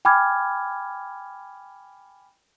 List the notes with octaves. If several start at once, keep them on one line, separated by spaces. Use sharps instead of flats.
G5 G#5 B5 D6 F6 G#6